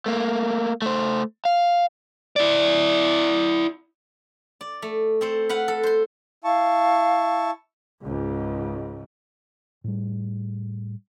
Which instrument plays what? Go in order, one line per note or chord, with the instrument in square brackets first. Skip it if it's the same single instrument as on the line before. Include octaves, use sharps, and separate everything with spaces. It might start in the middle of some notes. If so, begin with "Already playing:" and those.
[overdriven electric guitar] A3 A#3
A3 C5
F5
[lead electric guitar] E4 D5
[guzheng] D5
A3
C4 A4 C5
B4 F5 F#5
A4
C5 C6
[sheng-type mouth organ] E4 A5 C#6 [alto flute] F5
[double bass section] C#2 G#2
[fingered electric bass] A2 G3